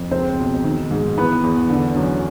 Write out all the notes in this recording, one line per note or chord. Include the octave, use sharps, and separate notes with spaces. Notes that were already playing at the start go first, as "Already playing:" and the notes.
Already playing: F2
C#2 C4 C5
B2
D#3
G#2
E3 B3 B4
E2
D3
F#2